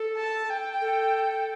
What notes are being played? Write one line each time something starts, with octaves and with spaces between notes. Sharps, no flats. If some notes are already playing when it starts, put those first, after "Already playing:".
Already playing: A4
A5
G5
A4